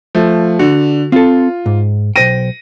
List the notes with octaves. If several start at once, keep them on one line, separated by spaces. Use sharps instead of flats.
F3 A3
D3 F#4
C4 F4 A4
G#2
B1 C5 G5 A#6 D#7